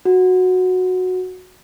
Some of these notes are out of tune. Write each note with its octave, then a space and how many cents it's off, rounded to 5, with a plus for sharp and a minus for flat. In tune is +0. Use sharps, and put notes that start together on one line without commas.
F#4 -10